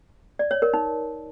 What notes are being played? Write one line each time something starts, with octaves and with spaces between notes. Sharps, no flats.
D5
C#5
A#4
D#4